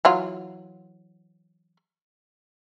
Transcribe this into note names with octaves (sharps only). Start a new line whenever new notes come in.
E3 F#3 F4